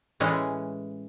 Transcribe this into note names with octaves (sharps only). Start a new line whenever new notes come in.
A2 E3 G#3 C#4